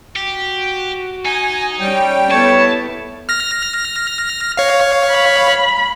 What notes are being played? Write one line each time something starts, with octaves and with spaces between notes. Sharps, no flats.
F#4 G4
D#4 G#5
G3 C#4 C#5 G5
B3 E4 A4 C#5 A5
F6 A#6
C#5 F5
B5